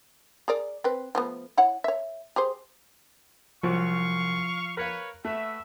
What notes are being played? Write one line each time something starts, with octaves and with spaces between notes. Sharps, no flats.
G#4 A#4 D5
C4 B4
F3 A3 B3
E4 C#5 F#5
C#5 E5
G4 G#4 C5
C2 F3 F#3 F5 C#6
A#4 B4 C#5 F5
A3 F#4 B4 E5